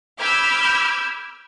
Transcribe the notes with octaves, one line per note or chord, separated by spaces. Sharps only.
B5 D6 E6 F6 G6 G#6